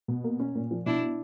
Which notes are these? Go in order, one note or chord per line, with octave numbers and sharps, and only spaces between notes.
B2
A#3
C#4
A#2
F3
B2 D4 E4